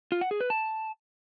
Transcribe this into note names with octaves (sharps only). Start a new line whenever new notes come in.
F4
F#5
G#4
B4
A5